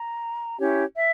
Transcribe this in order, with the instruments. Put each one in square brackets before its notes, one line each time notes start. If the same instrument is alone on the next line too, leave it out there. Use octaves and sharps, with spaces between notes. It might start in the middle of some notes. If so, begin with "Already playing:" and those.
Already playing: [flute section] A#5
C#4 E4 G4 C#5
E5